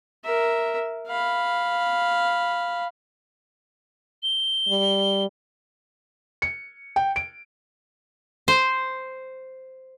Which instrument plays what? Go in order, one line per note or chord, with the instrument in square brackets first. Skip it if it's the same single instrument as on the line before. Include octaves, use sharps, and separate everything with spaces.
[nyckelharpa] A#4 E5
F5 B5
[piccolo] G7
[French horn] G3
[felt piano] C#7
G5
D7
[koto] C5